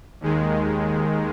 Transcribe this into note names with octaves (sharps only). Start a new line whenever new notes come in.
D#2 D#3 G#3